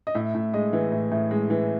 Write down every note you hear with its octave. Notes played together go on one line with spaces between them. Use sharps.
D#5
A2 E5
A2
G#3 D#5
E3
A2
A2
G#3
E3